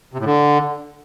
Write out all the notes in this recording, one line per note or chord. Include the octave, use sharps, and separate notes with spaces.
C3
A2
D3